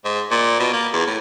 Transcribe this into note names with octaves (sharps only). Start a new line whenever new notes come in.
G#2
A#2
B2
A#3
E2
A2